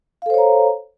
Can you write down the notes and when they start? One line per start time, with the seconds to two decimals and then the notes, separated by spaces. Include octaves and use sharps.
0.22 F5
0.26 A4
0.30 C5
0.34 C#5
0.38 A#5